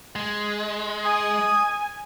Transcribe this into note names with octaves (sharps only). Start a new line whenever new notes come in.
G#3
G#5 D#6